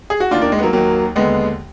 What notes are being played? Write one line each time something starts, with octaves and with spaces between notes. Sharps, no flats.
G#4
F#4
D#2 D#3 D4 F4
A#3 D4
G#3
B3
F#3 A#3
D#2 D#3 F#3 A#3
D#2 D3 G#3 B3